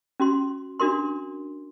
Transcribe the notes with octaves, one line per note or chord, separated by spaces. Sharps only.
C#4 F#4 C6
D4 F#4 A#4 C6